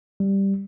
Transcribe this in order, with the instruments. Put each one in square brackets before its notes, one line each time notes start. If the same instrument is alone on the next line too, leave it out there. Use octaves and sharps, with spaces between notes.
[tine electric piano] G3